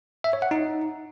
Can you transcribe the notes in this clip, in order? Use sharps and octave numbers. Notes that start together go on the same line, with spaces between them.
E5
C#5
F#5
D#4